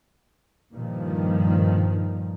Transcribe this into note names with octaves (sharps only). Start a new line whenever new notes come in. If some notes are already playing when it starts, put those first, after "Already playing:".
G2 A#2 D#3 F3